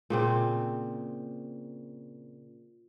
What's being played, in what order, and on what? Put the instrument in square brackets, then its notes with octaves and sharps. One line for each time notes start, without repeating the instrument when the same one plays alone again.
[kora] A#2 C#3 C4